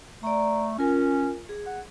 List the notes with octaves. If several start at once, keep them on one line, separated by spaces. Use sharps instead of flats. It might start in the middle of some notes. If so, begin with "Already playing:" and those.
A3 D5 A#5
C#4 F4 A#4 G#5
G#4
F#5